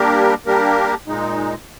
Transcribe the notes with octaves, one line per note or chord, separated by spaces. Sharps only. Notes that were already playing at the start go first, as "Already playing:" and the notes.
Already playing: G3 A#3 D4 G4 A#4
G3 A#3 D4 G4 A#4
A#2 G#3 D#4